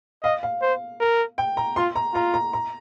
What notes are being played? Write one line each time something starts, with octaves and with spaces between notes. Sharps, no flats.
D#5 F5
F5
C5
A#4
G5
A#5
F4 C6
A#5
F4 A#5
A#5
A#5